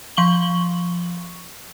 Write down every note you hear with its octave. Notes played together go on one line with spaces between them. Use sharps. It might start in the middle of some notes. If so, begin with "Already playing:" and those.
F3 C#6 F#7 G7